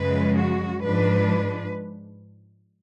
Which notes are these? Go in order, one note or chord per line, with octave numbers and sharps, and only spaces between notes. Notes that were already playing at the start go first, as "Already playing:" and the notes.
Already playing: F#2 C#3 F3 G#3 B4
F#4
G#2 F3 G#3 D4 B4